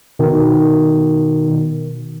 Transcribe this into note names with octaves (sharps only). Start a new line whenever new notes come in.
B2 D#3